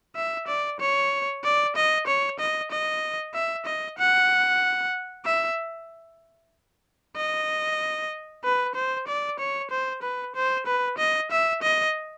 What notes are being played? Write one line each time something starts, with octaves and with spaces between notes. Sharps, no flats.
E5
D5
C#5
D5
D#5
C#5
D#5
D#5
E5
D#5
F#5
E5
D#5
B4
C5
D5
C#5
C5
B4
C5
B4
D#5
E5
D#5